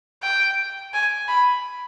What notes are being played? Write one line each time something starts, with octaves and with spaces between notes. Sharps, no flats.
G5
G#5
B5